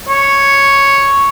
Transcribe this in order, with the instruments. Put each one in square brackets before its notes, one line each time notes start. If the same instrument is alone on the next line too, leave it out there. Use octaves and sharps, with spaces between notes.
[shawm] C#5